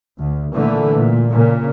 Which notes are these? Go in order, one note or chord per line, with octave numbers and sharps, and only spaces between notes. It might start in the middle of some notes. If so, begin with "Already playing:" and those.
D2
A#2 D3 E3 A3
A#2
A#2 C#3